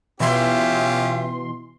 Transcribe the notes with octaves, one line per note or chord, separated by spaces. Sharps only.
B2 E3 C#4 F4 G4 E5 C6